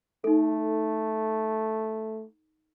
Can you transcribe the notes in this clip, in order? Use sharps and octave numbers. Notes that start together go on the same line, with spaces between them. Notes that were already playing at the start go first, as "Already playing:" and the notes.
A3 D#4 A4